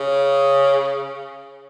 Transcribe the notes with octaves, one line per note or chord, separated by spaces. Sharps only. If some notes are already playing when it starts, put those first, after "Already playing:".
Already playing: C#3